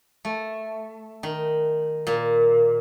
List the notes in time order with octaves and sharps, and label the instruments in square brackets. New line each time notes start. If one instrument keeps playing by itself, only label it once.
[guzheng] A3
D#3
A#2